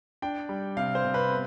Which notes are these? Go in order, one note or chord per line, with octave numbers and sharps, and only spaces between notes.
D4 G5
G3
C3 F5
C5
C3
B4
B3